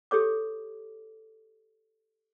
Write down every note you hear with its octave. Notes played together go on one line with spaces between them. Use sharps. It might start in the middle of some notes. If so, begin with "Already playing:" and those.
G4 A4 C#5 D6